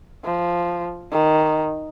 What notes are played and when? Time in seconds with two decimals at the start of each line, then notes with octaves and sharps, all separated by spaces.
0.25 F3
1.12 D#3